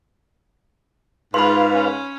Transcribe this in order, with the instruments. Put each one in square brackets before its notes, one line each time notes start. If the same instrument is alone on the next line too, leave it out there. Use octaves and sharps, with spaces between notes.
[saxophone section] G#2 [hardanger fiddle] F4 [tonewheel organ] B4 F5 [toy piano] B5 C6
[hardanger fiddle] C#4